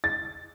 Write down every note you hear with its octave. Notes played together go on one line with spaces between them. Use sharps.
A6